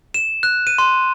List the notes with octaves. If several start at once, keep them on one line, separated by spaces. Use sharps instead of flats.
E7
F#6
D#7
C6